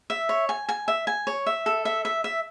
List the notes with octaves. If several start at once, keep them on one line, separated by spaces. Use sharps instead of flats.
E5
C#5
G#5
G#5
E5
G#5
C#5
E5
A4
E5
E5
E5